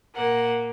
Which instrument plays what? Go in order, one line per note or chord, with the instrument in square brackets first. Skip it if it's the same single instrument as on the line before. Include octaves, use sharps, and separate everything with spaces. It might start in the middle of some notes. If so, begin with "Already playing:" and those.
[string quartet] A#2 A#3 F#5